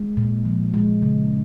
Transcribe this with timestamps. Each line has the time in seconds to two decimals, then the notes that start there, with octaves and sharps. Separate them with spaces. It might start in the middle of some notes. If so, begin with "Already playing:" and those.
Already playing: G#3
0.17 A#2
0.45 F3
0.74 G#3
1.02 C#3